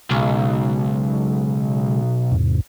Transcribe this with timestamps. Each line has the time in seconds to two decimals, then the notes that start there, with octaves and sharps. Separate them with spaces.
0.10 B1 C#3 G#3
2.32 E2 G#2 C3